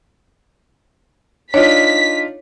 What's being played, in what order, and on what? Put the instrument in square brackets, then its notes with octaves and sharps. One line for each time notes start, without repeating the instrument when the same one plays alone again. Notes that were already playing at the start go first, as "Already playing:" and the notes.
[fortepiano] D4 D#4 F4 [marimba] C#5 [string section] B6